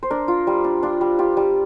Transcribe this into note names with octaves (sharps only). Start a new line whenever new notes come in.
C5
D4 A#4
F4
G3
D4
D4 F4
G3
F4 G4
G3